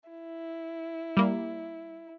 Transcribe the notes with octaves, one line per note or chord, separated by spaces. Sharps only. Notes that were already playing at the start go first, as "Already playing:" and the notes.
E4
G3 A#3